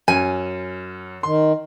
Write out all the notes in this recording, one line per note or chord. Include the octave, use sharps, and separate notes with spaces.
F#2 G#5
D#3 C6